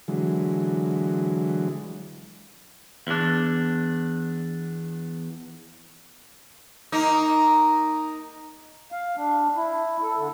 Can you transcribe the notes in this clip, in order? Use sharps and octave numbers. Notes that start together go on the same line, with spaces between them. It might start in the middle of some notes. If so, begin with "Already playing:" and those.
D3 E3 F#3 G#3
E2 D4
A#3 D#4
F5
D4
E4
A4
D3